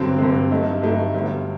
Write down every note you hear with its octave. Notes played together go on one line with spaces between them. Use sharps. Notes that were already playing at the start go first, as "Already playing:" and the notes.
Already playing: G2 D3 F#3 C4
G2 D3 F#3 C4
G2 F#3 A3 D#4
G2 F#3 A3 D#4
G1 G2 F#3